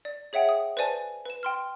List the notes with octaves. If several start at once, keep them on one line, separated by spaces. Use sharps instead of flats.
D5
G#4 C#5 E5 F#5 G5
D#6
B4 C5 D5 G#5 A5
B4 E7
G5 C6 F6